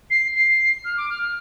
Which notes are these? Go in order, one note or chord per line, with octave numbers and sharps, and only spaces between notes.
C7
C7
F6
D6
F6
F6